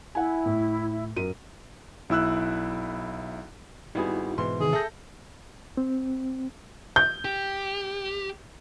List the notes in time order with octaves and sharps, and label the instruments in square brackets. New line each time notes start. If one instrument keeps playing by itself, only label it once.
[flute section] E4 [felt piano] F#5 G#5
[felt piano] A2
F#2 A#4 D#7
[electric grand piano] B1 E4 E6 F#6
[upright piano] G#1 [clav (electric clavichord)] G3 B3 G#4 [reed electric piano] D#4 E4 F#4
[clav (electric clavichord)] G#2 B2 E3 [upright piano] C6
[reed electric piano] C3 D#3 [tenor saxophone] G#4
[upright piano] A4 A#6 [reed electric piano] E5 G6
[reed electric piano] C4
[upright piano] G6
[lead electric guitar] G4